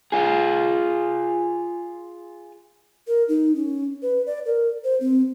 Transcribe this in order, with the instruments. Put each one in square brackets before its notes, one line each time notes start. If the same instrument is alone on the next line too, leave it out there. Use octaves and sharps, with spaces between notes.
[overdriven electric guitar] F4 G#4
[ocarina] A#4
D#4
C#4
B4
D5
A#4
C5
C4